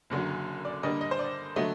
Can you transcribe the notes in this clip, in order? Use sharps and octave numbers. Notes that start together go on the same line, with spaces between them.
F#1 F#2 D3 F#3
D5
G2 D3 G3 A#3 D#5
D#5
C5
D5
D3 F#3 A3 D#5